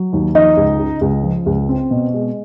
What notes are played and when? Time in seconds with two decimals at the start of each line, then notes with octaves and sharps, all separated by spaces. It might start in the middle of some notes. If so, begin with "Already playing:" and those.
Already playing: F#3
0.13 D#2
0.35 F3 D#4 D#5
0.57 C#2
0.79 C#3
1.01 C#2
1.23 F3
1.46 C#2
1.69 C4
1.91 B2
2.13 G#3